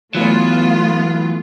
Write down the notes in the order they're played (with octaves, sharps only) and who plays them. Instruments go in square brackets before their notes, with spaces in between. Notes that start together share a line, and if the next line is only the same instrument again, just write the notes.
[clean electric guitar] E3 F#3 [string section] A3 B3 F4